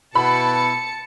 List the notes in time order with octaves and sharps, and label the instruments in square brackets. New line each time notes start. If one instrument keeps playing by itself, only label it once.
[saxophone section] B2 [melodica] E4 [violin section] A5 C#7 [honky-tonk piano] B5